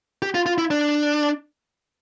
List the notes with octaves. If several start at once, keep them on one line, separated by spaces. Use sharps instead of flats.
G4
F4
F4
E4
D4